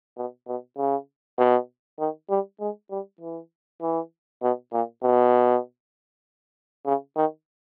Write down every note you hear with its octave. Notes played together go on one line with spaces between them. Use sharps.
B2
B2
C#3
B2
D#3
G3
G#3
G3
E3
E3
B2
A#2
B2
C#3
D#3